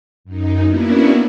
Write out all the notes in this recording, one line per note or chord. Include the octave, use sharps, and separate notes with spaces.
F#2 D#4
A#3 B3 C#4 D4 E4 F#4